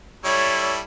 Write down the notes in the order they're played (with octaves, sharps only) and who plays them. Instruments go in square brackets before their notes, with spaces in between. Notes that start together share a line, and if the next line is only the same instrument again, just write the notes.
[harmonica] G3 E4 A4 [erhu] C#5